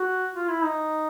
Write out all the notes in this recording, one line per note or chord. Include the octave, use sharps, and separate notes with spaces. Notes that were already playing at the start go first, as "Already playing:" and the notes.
Already playing: F#4
F4
E4
D#4